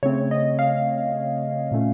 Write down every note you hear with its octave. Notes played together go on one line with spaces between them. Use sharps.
C#3 A3 C4 C#5
D#5
F5
A#2 A3 C#4